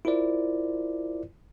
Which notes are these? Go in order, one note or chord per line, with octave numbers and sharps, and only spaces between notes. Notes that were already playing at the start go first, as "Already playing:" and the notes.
E4 F4 A#4 C5 D5